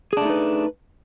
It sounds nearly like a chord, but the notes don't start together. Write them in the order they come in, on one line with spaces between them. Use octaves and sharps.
G#4 D4 A3 D#4 B4